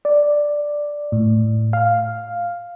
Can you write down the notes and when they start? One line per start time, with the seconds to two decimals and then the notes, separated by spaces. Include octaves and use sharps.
0.05 D5
1.12 A2
1.73 F5